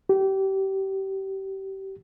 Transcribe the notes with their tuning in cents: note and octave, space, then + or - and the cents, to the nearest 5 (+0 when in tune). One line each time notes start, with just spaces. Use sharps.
G4 -25